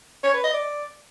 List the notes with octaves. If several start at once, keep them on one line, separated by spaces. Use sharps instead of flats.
C#5
B4
D#5
D5